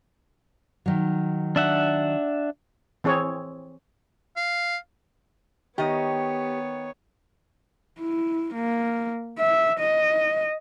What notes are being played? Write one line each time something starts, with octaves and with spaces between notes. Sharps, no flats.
D#3 F#3
D4 E5 F#5
E3 C4 G#4 C#5
F5
D#3 B3 G4 C#5 D#5 G5
E4
A#3
E5
D#5